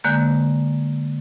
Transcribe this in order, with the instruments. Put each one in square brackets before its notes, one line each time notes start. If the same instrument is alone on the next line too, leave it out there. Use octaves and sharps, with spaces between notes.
[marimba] D3 G#3 A#3 F#6 G6